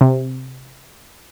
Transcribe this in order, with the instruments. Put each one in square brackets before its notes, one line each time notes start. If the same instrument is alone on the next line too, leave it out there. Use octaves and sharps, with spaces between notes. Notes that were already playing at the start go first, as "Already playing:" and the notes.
[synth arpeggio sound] C3